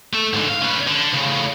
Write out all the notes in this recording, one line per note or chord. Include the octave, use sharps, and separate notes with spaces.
A3 A4
G#2 D3
F5
C#4 B4
D3
A2 C#3